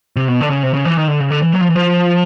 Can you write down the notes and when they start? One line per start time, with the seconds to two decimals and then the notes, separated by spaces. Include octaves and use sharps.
0.16 C3
0.28 B2
0.41 D3
0.50 C#3
0.63 C3
0.74 C#3
0.85 E3
0.97 D#3
1.08 D3
1.20 C#3
1.30 D3
1.42 E3
1.53 F#3
1.61 F3
1.68 E3
1.75 F3